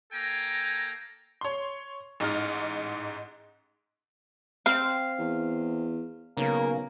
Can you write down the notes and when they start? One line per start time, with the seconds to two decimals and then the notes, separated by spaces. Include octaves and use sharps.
0.12 A#3 A4 G5 G#5 A#5
1.41 C#5 C6
2.20 A1 G#2 D#4 F6
4.66 C4 F5
5.19 E2
6.37 B1 C#3 A#3